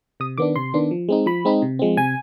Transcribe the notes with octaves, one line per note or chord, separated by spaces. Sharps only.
C3 D#6
D#3 B3 D4 D6
C3 C6
D#3 B3 D4
F3
G#3 C4 D#4
F3 B5
G#3 C4 D#4
C3
F3 G#3 C4
C3 G#5